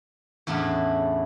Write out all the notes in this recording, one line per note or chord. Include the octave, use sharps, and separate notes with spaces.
E2 A2 C#3 D4 E4 B5